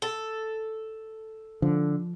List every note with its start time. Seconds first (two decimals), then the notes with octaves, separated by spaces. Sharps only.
0.02 A4
1.62 D3 F3